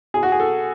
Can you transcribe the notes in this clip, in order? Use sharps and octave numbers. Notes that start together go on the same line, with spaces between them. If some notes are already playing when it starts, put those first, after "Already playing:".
B2 G#4
F#4
G#4
A4